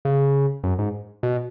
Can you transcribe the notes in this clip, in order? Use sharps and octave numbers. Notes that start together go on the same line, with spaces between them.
C#3
F#2
G#2
B2